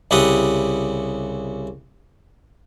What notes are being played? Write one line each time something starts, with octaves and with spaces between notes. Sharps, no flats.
C2 C#3 E4 G4 F#5 D#6